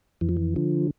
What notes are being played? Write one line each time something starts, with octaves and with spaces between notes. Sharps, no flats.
F2 E3
F3
E3
D3 F3